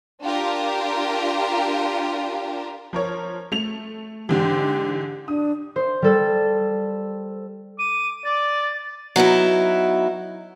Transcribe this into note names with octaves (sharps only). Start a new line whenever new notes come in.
D4 F4 G4 A#4
F3 A#4 C#5
A3 F7
G#2 D3 E3 G4
D4 D#6
C5
G3 A4
D6 D#7
D5 A6
F#3 B3 D#4 E4